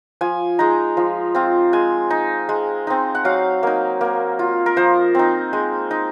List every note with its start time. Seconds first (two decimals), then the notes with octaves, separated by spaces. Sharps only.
0.21 F3 G#5
0.59 G#3 D#4 A#5
0.97 F3
1.35 C4 F4
1.73 G#3 G#5
2.10 D#4
2.49 G#3
2.87 C4 D#4
3.15 F#5
3.25 F#3 F5
3.63 A#3 D#4
4.01 A#3
4.39 F4
4.66 A#4
4.77 F3 C5
5.15 C4 D#4
5.53 G#3
5.91 D#4